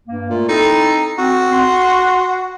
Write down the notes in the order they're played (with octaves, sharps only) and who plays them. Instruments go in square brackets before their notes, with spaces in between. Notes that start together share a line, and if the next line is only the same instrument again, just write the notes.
[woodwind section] G2 A#3
[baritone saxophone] A#2 [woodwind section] A3 F4
[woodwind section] C4 E4 A4 [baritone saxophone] D#4
[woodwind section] C4 [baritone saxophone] F#4
[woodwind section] F#5 C6